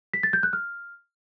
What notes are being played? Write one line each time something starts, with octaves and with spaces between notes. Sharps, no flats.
B6
A6
G6
F#6
F6